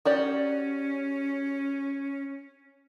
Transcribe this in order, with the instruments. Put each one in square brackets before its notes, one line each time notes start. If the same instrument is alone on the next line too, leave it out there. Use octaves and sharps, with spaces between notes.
[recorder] C#4 [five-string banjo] F#4 G4 D5